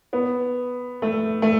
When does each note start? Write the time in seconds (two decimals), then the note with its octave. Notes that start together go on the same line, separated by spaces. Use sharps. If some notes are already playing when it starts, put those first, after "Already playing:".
0.13 B3
1.02 A3
1.42 A3